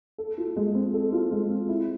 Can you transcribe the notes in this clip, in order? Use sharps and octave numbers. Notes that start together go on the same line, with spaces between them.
A4
F4
G#3
C4
A4
F4
G#3
C4
E4